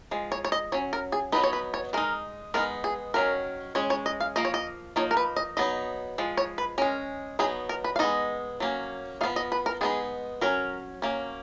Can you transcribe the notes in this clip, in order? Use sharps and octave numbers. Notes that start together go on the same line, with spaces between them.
F3 G#3
C#5
C#5
D#5
F#3 C#4 C#5
A#4
G#4
F#3 B3 D#4 B4
C#5
B4
C#5
G#3 D#4 A#4
G#3 B3 D#4 A#4
G#4
D#3 F#3 C#4 A#4
G#3 C#4 C#5
C#5
D#5
F5
F3 A#3 D#5
C#5
D#5
F3 A#3 D#4 C#5
A#4
B4
D#5
F#3 B3 D#4 D#5
F3 G#3
C#5
B4
G#3 C#4 A#4
F#3 B3 D#4 G#4
A#4
B4
F5
G#3 B3 D#4 D#5
F#3 A#3 C#4
F3 B3 D#4 F5
D#5
B4
A#4
G#3 B3 D#4 G#4
F#3 C#4 A#4
F#3 A#3 C#4